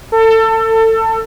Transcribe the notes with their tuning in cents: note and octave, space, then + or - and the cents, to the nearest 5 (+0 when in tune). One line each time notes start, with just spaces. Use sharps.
A4 +25